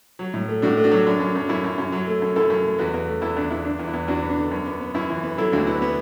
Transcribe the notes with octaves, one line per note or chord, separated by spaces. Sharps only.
F#3
A2
A3
A2 D4 F#4
A3
D4 F#4
F#3
F#2 D4
F#2
F#2
F#2 E4
F#2
F#2
F#3
A3
F#2
F#2 E4 A4
F#2
A3
E2 F#4 B4
E2
A3
E2 E4 A4
E2 D4
E2 E4
D3 D4
E2
E4
E2
E2 D4 F#4
B3
D4
D3
F#2
B3
B3
F#2 E4
E3
B3
F#3 E4 A4
D2 D4 F#4
B3 E4
B3